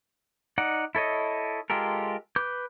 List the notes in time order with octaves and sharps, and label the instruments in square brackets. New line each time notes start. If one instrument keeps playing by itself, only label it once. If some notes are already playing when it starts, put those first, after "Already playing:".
[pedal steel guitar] D#4 D5 F#5
E4 A4 C#5 D#5
G#3 F4 G4 A4 A#4
B4 D6 G6